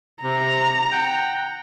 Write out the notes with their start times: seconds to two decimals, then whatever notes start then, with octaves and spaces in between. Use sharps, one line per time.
0.22 C3 A#5
0.92 F#5 G5